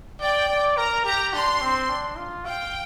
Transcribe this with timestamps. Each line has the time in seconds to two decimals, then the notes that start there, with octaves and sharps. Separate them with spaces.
0.21 D5 G5
0.49 D5
0.77 A#4 A#5
1.05 G4 A#5
1.33 D4 C6
1.61 C4
1.89 D4
2.17 F4
2.46 F5 G5